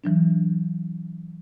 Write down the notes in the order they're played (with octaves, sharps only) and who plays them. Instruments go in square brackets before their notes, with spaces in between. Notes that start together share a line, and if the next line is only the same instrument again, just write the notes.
[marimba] E3 F#3 D4